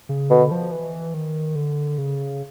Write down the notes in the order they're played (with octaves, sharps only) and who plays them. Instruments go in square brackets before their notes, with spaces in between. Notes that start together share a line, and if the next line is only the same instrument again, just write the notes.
[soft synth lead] C#3
[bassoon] B2 [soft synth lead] D3
[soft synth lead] F3
E3
D#3
D3
C#3